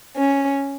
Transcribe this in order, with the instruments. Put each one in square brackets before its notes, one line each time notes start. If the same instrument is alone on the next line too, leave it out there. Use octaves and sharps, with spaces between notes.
[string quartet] C#4